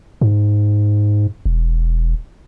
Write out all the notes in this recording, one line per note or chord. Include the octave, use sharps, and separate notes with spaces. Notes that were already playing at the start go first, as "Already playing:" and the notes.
G#2
E1